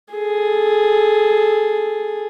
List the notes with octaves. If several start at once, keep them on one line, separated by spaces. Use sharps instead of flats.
G#4 A4